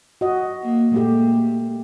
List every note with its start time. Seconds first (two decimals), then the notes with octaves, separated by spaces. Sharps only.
0.21 F#4 D#5
0.63 A#3
0.92 A#2 G#3 A3 G4